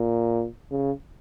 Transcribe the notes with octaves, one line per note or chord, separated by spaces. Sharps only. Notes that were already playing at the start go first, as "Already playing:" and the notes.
Already playing: A#2
C#3